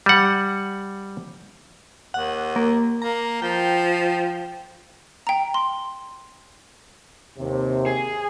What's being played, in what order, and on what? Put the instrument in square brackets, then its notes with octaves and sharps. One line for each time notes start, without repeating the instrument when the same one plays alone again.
[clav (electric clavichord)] G3 F#5
[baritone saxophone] D#2 [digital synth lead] F#5
[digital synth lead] A#3
[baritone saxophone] A#3 [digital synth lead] A#5
[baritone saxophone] F3 [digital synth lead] G5
[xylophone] G5 A#5
C6
[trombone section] D#2 C3
[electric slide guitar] G#4